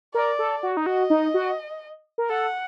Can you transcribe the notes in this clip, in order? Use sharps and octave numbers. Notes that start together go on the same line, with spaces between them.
A#4 D5
A4
F#4
D#4
F#4 D#5
D#4
F#4
A#4
A4 F#5